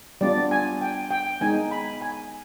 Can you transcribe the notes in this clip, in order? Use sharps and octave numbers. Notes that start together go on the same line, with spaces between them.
G3 B3 D4 F4 D5
G#5
G5
G5
G#3 B3 D#4 G#5
B5
G#5